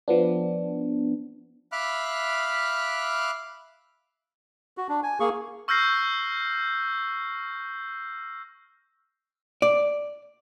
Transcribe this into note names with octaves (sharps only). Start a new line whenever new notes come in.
F3 B3 D4
E5 F5 B5 D6 F6 F#6
F#4
D4
G#5
A#3 G#4 C#6
C#6 E6 F6 G6 A#6 C7
D5